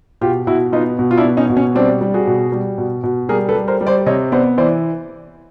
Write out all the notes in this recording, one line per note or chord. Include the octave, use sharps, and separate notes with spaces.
B2 F4 G4
B2 E4 F#4
B3 D#4 F4
B2
F4
D4 E4
B3
C#4 D#4
B2
C#4
G3 C4 D4
G3
F#4 G#4
B2
G3
B2
B2
G3 G#4 A#4
A4 B4
G3
A#4 C5
G3
C5 D5
C3 C#5 D#5
B3 C5 D5
E3 C5 D5